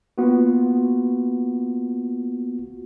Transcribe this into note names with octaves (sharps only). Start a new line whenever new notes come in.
A#3 B3 F4 F#4